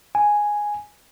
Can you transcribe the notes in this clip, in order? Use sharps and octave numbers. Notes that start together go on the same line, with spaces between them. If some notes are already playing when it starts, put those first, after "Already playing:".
G#5